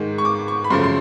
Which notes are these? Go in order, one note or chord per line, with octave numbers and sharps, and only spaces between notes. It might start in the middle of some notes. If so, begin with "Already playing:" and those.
Already playing: G#2 D#3 G#3
C#6
D6
C#6
B5
F#2 C#3 F3 A3 C6
C6